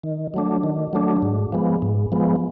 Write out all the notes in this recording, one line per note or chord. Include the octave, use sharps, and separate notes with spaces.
D#3
F#3 A3 D4
D#3
F#3 A3 D4
G#2
F3 G#3 B3
G#2
F3 G#3 B3